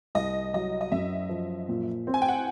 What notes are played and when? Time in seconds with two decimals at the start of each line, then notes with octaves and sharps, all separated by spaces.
0.15 C2 D#5
0.54 F#3 D#5
0.81 D#5
0.92 F#2 E5
1.29 F3
1.69 A#2
2.07 C4
2.14 G#5
2.22 G5
2.28 F#5